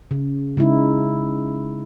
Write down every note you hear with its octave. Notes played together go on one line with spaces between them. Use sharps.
C#3
C#3 G#3 D#4 E4